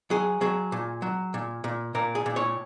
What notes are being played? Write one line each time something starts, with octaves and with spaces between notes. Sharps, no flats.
F#3 G#4
F#3 G#4
A#2
F#3
A#2
A#2
A#2 A#4
G#4
A#2
C#5